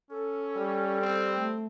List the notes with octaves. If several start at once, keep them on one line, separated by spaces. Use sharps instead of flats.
C#4 A4
G3
C4
A3